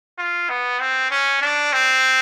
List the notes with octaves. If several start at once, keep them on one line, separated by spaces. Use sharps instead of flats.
F4
B3
C4
C#4
D4
C4